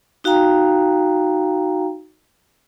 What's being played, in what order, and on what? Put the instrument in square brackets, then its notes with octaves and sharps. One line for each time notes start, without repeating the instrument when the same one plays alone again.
[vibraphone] D#4 F#4 F5 G5 A#5